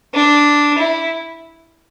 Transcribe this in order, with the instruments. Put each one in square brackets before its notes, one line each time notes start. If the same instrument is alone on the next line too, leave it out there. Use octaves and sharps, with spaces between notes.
[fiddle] D4
E4